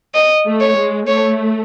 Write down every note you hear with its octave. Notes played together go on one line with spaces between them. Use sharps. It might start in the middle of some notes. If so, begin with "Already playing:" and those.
D#5
A3
C#5
G#3
A3 C#5